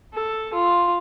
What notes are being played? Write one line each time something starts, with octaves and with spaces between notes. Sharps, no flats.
A4
F4